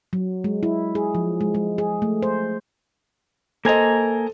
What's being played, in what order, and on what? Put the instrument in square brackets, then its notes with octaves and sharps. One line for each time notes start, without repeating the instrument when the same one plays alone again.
[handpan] F#3
G#3
E4
G#4
F3
G#3
G#3
G#4
A3
C5
[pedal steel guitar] A#3 G#5 A#5 [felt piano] A4 C5 D#5